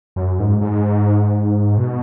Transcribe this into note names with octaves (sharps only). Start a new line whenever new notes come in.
F#2
G#2
G#2
B2